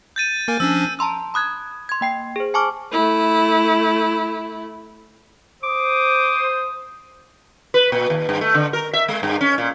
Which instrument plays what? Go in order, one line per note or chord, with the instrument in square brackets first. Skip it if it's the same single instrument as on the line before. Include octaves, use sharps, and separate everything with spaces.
[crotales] G6 A6 D#7
[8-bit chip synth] A#3 A#4 G#5
[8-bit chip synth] F3 C#4 D4 [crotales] E6
[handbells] A5 A#5 C6 E6
B5 D#6 F#6 G#6
C6 G#6
A#3 G5 C7
G#4 C5
G#5 A5 C#6 D6 F6
[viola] A3 E4
[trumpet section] C5 D#6 [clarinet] D6
[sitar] B4
A#2
D#2
G2
A3
D3
A#4
E5
G#3
G2
C#4
A#2